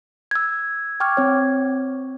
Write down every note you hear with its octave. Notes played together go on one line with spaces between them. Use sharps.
E6 G#6
G5 C#6 D6 F6 G#6
C4 C#5